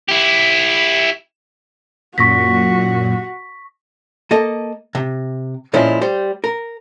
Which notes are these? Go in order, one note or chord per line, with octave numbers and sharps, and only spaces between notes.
E4 G4
F#2 A#2 F#4 C#6 A#6 B6
A#3 A4 D#5
C3
A#2 F3 G#3 C#4 E4 F4
G3 C5
A#4